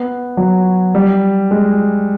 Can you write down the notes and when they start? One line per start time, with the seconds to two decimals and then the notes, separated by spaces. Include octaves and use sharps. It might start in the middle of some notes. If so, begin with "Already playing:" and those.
Already playing: B3
0.37 F#3
0.95 G3
1.51 G#3